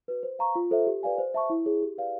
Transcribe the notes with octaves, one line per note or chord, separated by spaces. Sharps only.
F#4 B4
C5
F5 A#5 C#6
F4
A4 C5 E5
G4
B4 D5 F5 G#5
C5
E5 A5 C#6
E4
G#4 C#5
G4
B4 D5 F5